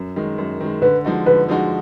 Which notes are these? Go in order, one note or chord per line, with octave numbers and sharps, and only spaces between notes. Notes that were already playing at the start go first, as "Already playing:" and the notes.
Already playing: F#2
D#3 G#3
F#2
D#3 G#3
D3 B4
F3 G#3 D#4 F#4
D3 B4
F3 G#3 D#4 F#4